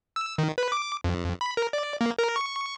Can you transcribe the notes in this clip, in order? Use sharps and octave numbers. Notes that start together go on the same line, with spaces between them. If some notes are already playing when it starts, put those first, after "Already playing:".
E6
D#3
B4
D6
F2
B5
A#4
D5
A#3
A#4
C#6